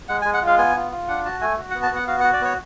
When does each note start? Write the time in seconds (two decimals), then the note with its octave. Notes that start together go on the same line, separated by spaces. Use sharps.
0.09 G#3 F#5
0.22 G#3 G#5
0.34 F#5
0.42 F4
0.47 F5
0.58 B3 G#5
0.76 F4
0.92 F4
1.08 D4 F#5
1.25 F#4 A5
1.41 A3 G#5
1.58 F#4
1.70 F#5
1.75 B3
1.83 A5
1.91 B3 F#5
2.07 F#4 F5
2.20 F#5
2.24 F#4
2.33 D5
2.41 B3 C#5